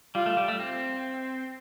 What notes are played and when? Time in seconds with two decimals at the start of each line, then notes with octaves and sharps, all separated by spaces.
0.15 G3 F4
0.26 A3
0.37 G3
0.48 A3
0.59 C4